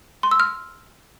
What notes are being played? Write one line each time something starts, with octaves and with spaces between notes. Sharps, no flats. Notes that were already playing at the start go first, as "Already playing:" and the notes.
C6
E6
F6